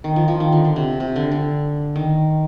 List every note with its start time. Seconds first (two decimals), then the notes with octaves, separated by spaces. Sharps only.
0.04 D#3
0.16 F3
0.28 F3
0.40 D#3
0.52 D3
0.65 D3
0.76 C3
1.00 C3
1.16 D3
1.32 D3
1.96 D#3